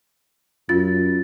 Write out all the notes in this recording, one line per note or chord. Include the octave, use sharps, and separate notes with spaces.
F#2 F4 A6